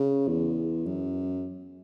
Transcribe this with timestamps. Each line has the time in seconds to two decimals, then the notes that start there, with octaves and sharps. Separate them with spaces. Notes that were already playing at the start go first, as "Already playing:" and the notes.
Already playing: C#3
0.28 E2
0.86 F#2